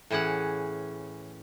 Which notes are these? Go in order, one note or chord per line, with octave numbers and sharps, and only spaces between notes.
A2 E3 C#4 G#4 F#5